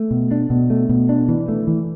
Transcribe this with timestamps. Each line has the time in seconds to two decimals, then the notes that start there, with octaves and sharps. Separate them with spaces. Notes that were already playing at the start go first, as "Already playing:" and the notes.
Already playing: A3
0.11 B2
0.31 D4
0.50 B2
0.70 A3
0.89 B2
1.09 D4
1.28 E3
1.48 A3
1.67 E3